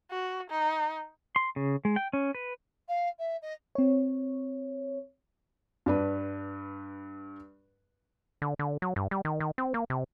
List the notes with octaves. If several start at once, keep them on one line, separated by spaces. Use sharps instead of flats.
F#4
D#4
C6
C#3
G#3
G5
C#4
B4
F5
E5
D#5
C4 C#5
G2 D4 B4
D3
D3
F#3
G2
G3
D#3
D#3
C4
A#3
C3